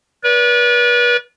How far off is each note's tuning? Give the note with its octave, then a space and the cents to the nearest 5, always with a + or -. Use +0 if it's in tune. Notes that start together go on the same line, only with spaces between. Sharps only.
B4 -35 D5 -30